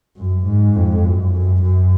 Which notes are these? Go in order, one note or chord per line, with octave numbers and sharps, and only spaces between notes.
F#2
G#2
F2
F#2
F#2
F#2